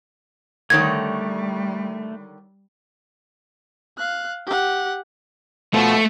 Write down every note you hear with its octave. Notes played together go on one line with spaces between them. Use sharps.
D3 D#3 G3 A3 C#5 G#6
F5 F#6
G4 F#5
B2 F3 A3